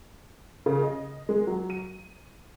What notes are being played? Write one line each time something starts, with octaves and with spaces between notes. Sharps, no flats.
C#3
D#5
G#3
F#3
D#7